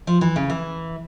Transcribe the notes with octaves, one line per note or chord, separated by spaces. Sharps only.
F3
E3
C#3
E3